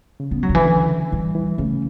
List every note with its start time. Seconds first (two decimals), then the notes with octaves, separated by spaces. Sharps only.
0.20 C#3
0.31 B3
0.43 F#3
0.49 D3
0.55 E3
0.65 D3
1.12 E3 G3
1.35 E3
1.58 C#3 A3